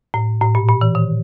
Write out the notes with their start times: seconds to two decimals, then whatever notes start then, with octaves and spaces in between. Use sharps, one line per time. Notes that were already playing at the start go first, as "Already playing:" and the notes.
0.14 A2
0.42 A2
0.55 A#2
0.68 A#2
0.81 E3
0.95 D#3